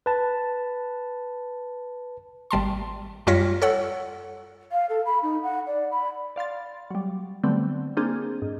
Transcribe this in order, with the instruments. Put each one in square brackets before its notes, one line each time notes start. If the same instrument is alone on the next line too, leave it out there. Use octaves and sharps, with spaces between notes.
[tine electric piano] B4 A5
[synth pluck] G#1 G3 A5 C6
F#2 G3 F4 C#5 A#6 B6
A4 C#5 F#5 E6
[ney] F5
A4
B5
D#4
F#5
D5
B5
[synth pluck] D5 F5 C6 A6
F#3 G3
D3 F#3 G3 A3 B3 C4
A#3 C4 D4 G#4
G#2